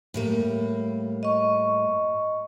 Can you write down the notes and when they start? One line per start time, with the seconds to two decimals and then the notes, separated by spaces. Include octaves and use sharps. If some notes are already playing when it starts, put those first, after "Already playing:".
0.14 A2 G3 A#3
1.23 D#5 C#6